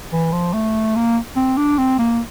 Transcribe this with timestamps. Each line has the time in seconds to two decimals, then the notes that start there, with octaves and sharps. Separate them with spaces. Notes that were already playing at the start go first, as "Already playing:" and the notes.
0.13 E3
0.33 F3
0.54 A3
0.96 A#3
1.36 C4
1.57 D4
1.78 C4
1.99 A#3